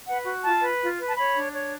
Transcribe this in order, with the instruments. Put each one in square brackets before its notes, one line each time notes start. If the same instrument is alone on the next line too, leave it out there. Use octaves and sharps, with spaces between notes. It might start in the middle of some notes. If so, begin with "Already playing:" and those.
[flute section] B4 F#5
F#4
F4 A5
B4
F4
B4
A5
C#5 B5
D4
C#5